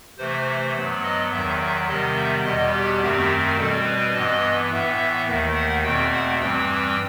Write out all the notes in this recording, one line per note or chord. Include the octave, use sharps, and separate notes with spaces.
C3 E3 A3 C5
G2 F#3 B3
D#5
E2 D#3 F#3 E5
E5
C3 D#3 G3 B3 D#5
E5
E2 B2 G3 B3 D#5
G4
F#2 D#3 A3 C4
B2 G3 C4 A4
B4
G2 E3 B3 D#5
A2 E3 B3 E5
D#2 D#3 A3
F#5
E2 B2 A3 C4 G5
F#5
G2 E3 G3 C4 G5